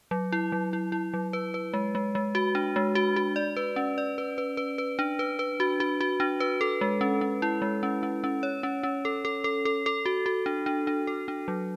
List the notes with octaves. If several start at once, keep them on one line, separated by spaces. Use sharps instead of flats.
F#3
E4
F#3
E4
E4
F#3
B4
B4
G#3
G#3
G#3
F#4
D4
G#3
F#4
F#4
D5
B4
C#4
D5
B4
B4
B4
B4
D4
B4
B4
F#4
F#4
F#4
D4
B4
A4
G#3
C#4
C#4
E4
G#3
C#4
C#4
C#4
C#5
C#4
C#4
A4
A4
A4
A4
A4
F#4
F#4
D4
D4
D4
A4
D4
F#3